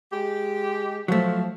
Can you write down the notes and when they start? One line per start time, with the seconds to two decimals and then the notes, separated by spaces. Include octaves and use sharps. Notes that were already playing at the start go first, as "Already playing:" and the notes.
0.13 G#3 G4
1.08 F3 F#3 A3